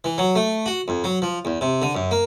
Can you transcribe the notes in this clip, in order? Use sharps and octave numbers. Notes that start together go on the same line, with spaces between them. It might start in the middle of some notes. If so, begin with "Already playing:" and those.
E3
F#3
A3
F#4
F2
F#3
F3
E2
C3
D3
F#2
A#3